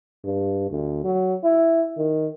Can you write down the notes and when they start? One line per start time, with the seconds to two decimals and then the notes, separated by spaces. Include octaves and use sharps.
0.25 G2
0.71 D2
1.04 F#3
1.44 E4
1.97 D#3